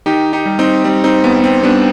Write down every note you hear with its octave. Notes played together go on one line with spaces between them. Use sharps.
D#3 D#4 G4
D#4 G4
G3
C4 D#4
G3 C4
C4 D#4
D#2 B3
C4
G3 B3 D4